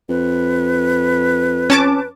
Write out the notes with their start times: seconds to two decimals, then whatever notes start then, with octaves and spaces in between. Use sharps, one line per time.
0.09 F2 B4
1.70 C#4 A5 D6